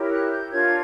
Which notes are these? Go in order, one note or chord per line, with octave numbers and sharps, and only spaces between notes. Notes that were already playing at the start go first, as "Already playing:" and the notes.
Already playing: E4 G4 A#4 C#5
F#6
G6
D4 F4 A#4 C#5 G#6